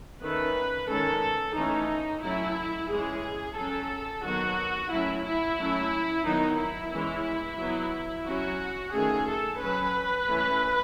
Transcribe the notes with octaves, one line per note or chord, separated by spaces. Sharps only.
D#3 A3 C#4 B4
D#3 G#3 C#4 A4
E3 A3 C#4 D#4
F#3 A3 C#4 E4
E3 G#3 C#4 G#4
F#3 C#4 A4
D#3 F#3 B3 F#4
F#3 A3 C#4 E4
E4
F#3 A3 C#4
D#3 F#3 B3 D#4
E4
E3 G#3 C#4
F#3 B3
F#3 C#4 F#4
D#3 A3 C#4 G#4
A4
F#3 C#4 B4
E3 A3 C#4